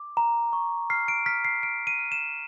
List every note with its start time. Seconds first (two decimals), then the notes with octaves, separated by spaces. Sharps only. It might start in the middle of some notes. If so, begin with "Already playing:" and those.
Already playing: D6
0.17 A#5
0.53 C#6
0.90 F6 C7
1.08 D7
1.26 F6 B6
1.45 C7
1.63 F6 D7
1.87 D#7
1.99 F6
2.12 E7